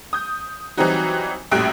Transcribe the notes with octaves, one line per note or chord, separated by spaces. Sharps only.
D#6 G6
E3 F#3 G3 C4 D#4 F#4
A#1 F#2 A2 G3 F#6 D7